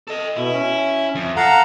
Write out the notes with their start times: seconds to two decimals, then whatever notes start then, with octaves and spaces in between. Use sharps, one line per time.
0.08 A4 D#5
0.37 B2 E4
0.53 C#4
1.15 F2
1.36 A4 F5 F#5 A#5